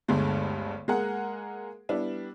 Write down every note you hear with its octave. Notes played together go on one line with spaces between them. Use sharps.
G1 D2 G2 G#3 A3
G#3 A#3 G#4 A#4 F#5
G3 B3 D4 E4